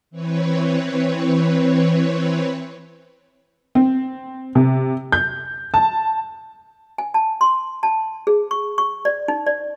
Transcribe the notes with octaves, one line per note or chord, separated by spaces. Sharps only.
E3 C4 B4 C#5
C4
C3
G6
A5
G#5
A5
C6
A5
G#4
C#6
C#6
D5
D#4
D5